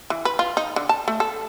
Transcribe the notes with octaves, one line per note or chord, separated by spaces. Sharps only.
E3
B4
F4
D#4
D3
A5
A3
A4